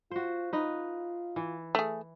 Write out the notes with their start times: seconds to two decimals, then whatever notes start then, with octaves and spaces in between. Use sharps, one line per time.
0.11 F4 F#4 C5
0.53 D#4 F4 B4
1.36 E3
1.75 A3 G#4